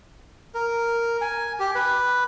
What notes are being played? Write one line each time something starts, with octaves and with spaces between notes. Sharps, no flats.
A#4
G#5
G4
B4